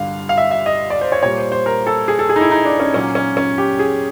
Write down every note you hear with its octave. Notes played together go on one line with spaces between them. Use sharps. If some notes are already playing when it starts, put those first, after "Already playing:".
Already playing: G2 D3 G3 F5
F5
E5
E5
D#5
D5
C5
C#5
A#2 G3 A#3 C#5
C5
C5
A#4
A4
G#4
A4
G#4
D#4
E4
D#4
D4
C#4
A#2 F#3 A#3 C#4
C#4
C#4
G4
G#4